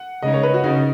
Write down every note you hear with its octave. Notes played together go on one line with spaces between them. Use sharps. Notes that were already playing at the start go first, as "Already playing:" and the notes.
Already playing: F#5
C#3 G#3 D#4 D#5
C#5
B4
F#4
C#3 D#4